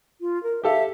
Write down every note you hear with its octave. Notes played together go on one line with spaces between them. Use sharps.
F4
A#4
G4 A4 E5 F5